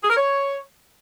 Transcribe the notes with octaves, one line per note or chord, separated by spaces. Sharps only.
G#4
A#4
C#5